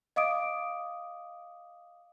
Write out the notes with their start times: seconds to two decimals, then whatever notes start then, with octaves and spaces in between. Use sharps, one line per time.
0.16 D#5 F5 D6 D#6 D7